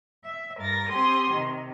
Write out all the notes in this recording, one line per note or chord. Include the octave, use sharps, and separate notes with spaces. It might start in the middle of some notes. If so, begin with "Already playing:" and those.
E5
G2 A#4 A6 A#6
C4 G4 G#5 C6 D#6
C3 D#3